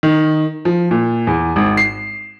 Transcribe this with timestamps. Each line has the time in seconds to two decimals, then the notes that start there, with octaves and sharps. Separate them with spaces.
0.03 D#3
0.65 F3
0.91 A#2
1.27 E2
1.56 G#1
1.77 C7